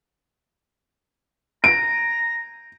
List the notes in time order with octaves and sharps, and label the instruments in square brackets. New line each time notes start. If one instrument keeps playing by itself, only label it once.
[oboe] A#5 [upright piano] D7